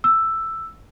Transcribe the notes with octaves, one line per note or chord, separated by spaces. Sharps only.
E6